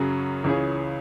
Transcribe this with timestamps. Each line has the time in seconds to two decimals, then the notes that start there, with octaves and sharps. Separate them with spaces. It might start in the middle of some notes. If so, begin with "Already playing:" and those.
Already playing: F#2 C#3 F#3 C#4 G#4
0.44 C#2 C#3 E3 C#4 G#4